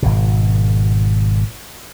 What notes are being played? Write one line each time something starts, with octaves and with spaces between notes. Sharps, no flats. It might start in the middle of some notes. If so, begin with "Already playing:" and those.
G#1 B2